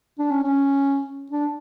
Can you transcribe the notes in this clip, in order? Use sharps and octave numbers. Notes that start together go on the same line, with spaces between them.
D4
C#4
C#4
D4